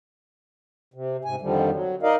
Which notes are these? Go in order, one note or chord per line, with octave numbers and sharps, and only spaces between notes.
C3
G#2 C3 G#5
F2 D3 D#3 F3 G3
F#3
D#4 A#4 D5 D#5 F5